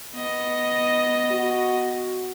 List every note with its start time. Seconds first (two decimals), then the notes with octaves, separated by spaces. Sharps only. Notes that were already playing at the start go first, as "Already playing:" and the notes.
0.13 B3 D#5
1.31 F#4